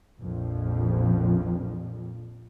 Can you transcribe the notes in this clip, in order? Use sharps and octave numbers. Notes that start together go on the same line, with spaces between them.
A#1 F2 F3